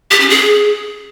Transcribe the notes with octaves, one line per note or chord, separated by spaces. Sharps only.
G4
C#4
G#4